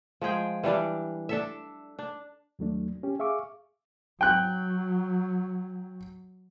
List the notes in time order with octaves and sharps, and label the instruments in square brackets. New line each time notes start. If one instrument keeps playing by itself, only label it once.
[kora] F3 G#3 G#4 G5
E3 G3 D4 D5
D4 A4 E5
D4
[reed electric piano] D#2 F#3 A3 D4
C#4 G4
G#4 E5 F5 C#6 D6
[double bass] F#3 [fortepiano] G5 F#6